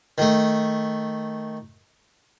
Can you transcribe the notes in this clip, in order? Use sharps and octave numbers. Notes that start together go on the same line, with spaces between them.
D#3 A3